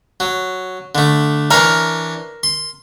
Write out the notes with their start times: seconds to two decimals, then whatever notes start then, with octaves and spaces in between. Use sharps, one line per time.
0.20 F#3
0.95 D3 A3
1.51 E3 D4 A#4 C#5
2.43 C6